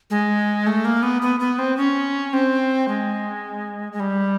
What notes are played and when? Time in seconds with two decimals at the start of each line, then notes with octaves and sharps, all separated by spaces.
0.10 G#3
0.67 A3
0.85 A#3
1.03 B3
1.22 B3
1.40 B3
1.59 C4
1.77 C#4
2.33 C4
2.88 G#3
3.92 G#3
4.00 G3